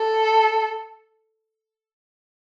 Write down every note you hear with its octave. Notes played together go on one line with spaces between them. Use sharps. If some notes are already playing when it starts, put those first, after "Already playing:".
Already playing: A4